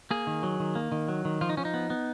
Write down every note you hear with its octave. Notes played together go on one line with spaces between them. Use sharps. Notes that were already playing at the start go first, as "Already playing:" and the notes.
A#3 G#4
D#3
F#3
D#3
A#3
D#3
F#3
D#3
F3 F4
D#4
F3 C#4
D#4
B3
B3